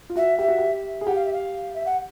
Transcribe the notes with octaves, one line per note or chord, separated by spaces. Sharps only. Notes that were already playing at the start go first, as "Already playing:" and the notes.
F4
F#4 E5
G4 E5
F#4
G4
G#4
G4 F#5
F5
E5
F5
E5
F#5